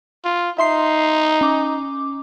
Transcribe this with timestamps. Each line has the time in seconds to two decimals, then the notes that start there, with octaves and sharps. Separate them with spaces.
0.25 F4
0.58 D#4 E5 C6 C7
1.41 C#4 D6